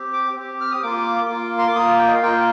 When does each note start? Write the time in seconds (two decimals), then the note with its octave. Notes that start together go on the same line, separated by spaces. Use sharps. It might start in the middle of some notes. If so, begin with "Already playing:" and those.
Already playing: C4 G4
0.13 D6
0.36 C4 G4
0.61 F6
0.71 D#6
0.83 A#3 F4 D6
1.30 A#3 F4
1.59 C6
1.67 D6
1.76 A#3 F4 D#6
1.99 G5
2.08 D#5
2.15 F5
2.22 A#3 F4 G5